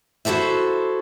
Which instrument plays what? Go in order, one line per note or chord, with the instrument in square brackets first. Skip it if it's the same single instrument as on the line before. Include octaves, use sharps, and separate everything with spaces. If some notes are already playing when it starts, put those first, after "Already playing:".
[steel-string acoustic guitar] E4 F#4 A4 C5 E5